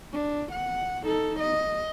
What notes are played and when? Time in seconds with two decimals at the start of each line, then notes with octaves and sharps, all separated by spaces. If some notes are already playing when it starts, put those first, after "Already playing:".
0.13 D4
0.52 F#5
1.04 D#4 A4
1.40 D#5